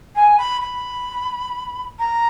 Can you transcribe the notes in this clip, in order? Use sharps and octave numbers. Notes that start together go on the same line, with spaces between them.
G#5
B5
B5
A#5